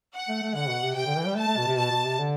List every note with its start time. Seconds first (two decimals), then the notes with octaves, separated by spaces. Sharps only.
0.15 F#5
0.29 A3
0.42 A3
0.55 D3 F#5
0.69 B2
0.83 C3
0.96 C3 G5
1.06 D3
1.17 E3
1.27 G3
1.37 A3 A5
1.48 A3
1.57 B2
1.68 C3
1.77 B2 A5
1.92 B2
2.05 C3
2.20 D3